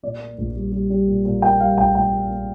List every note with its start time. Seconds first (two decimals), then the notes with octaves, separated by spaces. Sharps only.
0.03 A#2 D5
0.20 A#3
0.38 A#1
0.55 G3
0.72 G3
0.90 G3
1.07 A#2
1.25 A#2
1.42 A#3 G5
1.59 G3 F5
1.77 A#1 G5
1.95 A#1 G5
2.13 A#3
2.30 A#3